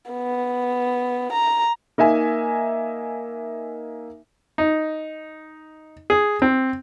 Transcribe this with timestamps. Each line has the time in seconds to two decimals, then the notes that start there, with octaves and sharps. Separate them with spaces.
0.11 B3
1.33 A#5
1.98 A#3 D#4 E5 G#5
4.58 D#4
6.10 G#4
6.42 C4